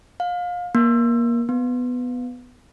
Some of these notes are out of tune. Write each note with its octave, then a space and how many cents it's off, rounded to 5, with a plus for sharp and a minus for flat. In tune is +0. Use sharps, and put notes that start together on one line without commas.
F5 +25
A#3 +20
B3 +10